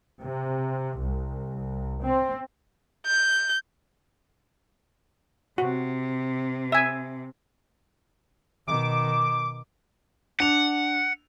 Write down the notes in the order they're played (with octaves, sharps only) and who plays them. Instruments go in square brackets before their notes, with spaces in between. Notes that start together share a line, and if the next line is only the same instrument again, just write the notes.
[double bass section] C3
C2
C4
[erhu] G6
[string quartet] C3 [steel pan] F#4
[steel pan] E5 G#5
[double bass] B2 D#3 [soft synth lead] D6
[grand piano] D4 F7 [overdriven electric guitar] F#5